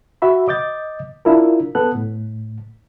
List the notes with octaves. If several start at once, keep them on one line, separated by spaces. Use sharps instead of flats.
F#4 E5 B5
D#5 D6 G6 A6
D4 E4 F4 A#4
B3 A4 F#6
A2